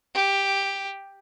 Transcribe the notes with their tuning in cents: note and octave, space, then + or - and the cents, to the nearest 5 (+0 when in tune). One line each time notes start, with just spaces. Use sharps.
G4 +5